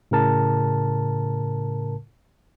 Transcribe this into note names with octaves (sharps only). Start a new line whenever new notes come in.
A2 C#3 A#4 A5